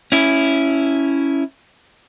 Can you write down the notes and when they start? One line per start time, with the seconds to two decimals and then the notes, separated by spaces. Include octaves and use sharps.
0.12 C#4 E4